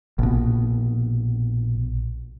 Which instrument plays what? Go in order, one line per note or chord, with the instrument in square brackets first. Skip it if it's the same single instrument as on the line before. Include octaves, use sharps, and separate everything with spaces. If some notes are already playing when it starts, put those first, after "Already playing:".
[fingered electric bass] A#1 B2